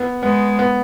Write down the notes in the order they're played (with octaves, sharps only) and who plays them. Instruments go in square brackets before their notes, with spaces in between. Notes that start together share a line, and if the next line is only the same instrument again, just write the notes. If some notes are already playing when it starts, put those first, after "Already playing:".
Already playing: [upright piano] B3
[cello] G#3 [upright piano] B3
[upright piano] B3